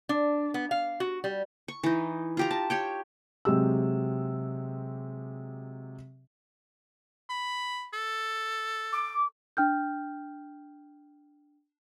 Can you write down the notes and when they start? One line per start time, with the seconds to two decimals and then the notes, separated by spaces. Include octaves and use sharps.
0.09 D4
0.54 B3
0.71 F5
1.00 F#4
1.24 G3
1.68 C#6
1.83 E3 D#4
2.37 F4 G4 A#5
2.51 A5
2.70 G4 C#5 G5
3.45 C3 F#3 G#3 G4 E6
7.29 B5
7.93 A4
8.93 D6
9.57 D4 G5 F6 G6